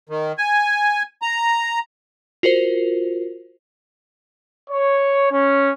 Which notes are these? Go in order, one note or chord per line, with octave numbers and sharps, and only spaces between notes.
D#3
G#5
A#5
F4 F#4 A#4 C5
C#5
C#4